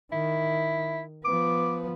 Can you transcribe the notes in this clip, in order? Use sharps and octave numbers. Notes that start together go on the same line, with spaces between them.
D#3 E4
F3 B3 D6